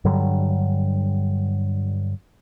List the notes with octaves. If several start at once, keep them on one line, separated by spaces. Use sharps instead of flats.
G2 D3 F#3 G3